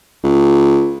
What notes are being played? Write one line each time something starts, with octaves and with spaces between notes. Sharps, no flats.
C#2